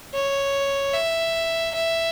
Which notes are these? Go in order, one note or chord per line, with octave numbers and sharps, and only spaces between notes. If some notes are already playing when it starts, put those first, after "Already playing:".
C#5
E5
E5